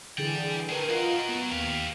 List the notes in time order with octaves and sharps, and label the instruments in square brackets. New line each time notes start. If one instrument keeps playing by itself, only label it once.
[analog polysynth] D3 E3 G#4 [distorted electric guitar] D5 G5
[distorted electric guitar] A3 G#4 [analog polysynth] A#4 B4 G5
[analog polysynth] F4 D#5 [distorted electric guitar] F#4 A#4
[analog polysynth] B3
[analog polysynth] D#2 [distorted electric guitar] G4 F5